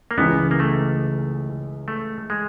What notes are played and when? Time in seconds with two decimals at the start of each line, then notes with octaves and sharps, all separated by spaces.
0.11 A#3
0.17 C#2 C#3 E3 B3
0.51 A#3
0.60 A3
1.88 A3
2.30 G#3